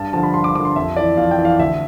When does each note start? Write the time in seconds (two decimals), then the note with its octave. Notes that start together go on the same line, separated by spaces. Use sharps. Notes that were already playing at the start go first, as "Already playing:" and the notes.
Already playing: G2 A5
0.13 D3 F3 A5
0.23 B5
0.34 G2 C6
0.44 D6
0.55 D3 F3 D6
0.65 C6
0.76 F2 E5
0.97 E3 D5
1.17 F2 F5
1.31 G5
1.39 E3
1.45 F5
1.59 D2 E5